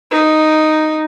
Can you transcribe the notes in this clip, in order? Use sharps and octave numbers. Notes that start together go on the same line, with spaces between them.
D#4